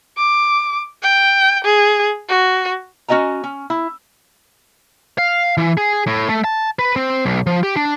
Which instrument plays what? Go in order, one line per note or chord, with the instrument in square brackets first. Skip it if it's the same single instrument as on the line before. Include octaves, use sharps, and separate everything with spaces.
[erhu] D6
G5
G#4
F#4
[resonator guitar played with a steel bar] C#4 F#4 D#5 G#5 A#5
C#4
E4
[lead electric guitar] F5
E3
G#4
A2
A3
A5
B4
C4
B1
F3
G4
D4